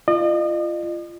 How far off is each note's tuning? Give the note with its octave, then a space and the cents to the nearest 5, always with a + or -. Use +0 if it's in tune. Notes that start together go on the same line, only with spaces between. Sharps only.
F4 -25 D#5 -40